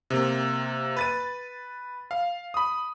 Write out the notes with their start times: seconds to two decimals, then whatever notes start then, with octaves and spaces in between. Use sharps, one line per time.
0.10 C3 A#3
0.97 B4 A6 D#7
2.11 F5
2.54 B5 D#6